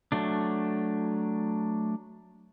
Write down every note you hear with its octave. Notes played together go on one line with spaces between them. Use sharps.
F#3 A3 D4